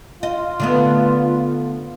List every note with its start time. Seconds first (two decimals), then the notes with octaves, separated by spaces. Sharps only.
0.23 F4 D#5
0.60 D3 A3 B3